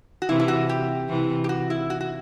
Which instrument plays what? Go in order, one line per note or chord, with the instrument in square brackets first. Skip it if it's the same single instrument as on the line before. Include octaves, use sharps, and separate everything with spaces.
[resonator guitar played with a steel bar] F#4
[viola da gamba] C3 E3 [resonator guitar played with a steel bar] E4
[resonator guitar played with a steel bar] E4
F#4
G4
[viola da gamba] C3 E3
[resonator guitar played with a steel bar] G4
F#4
E4
F#4
F#4